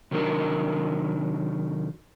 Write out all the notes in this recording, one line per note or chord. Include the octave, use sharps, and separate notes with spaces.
C3 D#3 F#3 D4 A#4